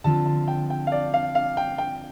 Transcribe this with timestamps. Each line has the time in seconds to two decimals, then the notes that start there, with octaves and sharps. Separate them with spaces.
0.04 D3 F3 C4 A5
0.26 A5
0.48 G5
0.70 G5
0.87 F5
0.92 D5
1.14 F5
1.35 F5
1.57 G5
1.78 G5